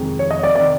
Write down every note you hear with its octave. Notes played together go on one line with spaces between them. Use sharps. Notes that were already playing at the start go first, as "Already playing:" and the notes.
Already playing: F2 C3 D#3 G#3
C#5
D#5
D5
C3 D#3 D5